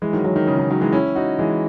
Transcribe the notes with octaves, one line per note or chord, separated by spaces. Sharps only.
E3 G#3
D#3 F#3
D#3 F#3
D#3
C#3
D#3
D#3 F#3
E3 G#3
C#4 E4
D#4 F#4
E3 G#3